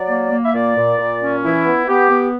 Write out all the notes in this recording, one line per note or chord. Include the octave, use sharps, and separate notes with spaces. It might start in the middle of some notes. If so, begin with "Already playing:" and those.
Already playing: F#3 D5
A#3
A#3
E5
A#2 D5
A#2
A#2
C#4
E3 E4
B3
B3 G4
B3